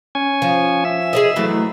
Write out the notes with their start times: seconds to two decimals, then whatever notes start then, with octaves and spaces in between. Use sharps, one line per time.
0.15 C#4 G#5
0.42 F3
0.85 E5
1.13 G#4 C#5 D#5
1.36 E3 F#3 A3